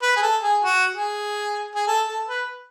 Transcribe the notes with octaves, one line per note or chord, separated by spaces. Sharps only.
B4
G#4
A4
G#4
F#4
G#4
G#4
A4
A4
B4